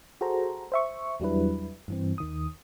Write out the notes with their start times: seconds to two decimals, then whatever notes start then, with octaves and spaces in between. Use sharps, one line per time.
0.21 F#4 G#4 A4 C5 A#5
0.72 C5 E5 C#6
1.20 E2 F#3 G3 D4 E4 B4
1.88 G2 E3 C4
2.18 D#2 D#3 D#6